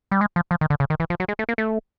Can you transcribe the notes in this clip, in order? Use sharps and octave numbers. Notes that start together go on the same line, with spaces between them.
G3
G#3
F3
F3
D#3
D3
C#3
D#3
E3
F3
F#3
G#3
A3
A#3
A3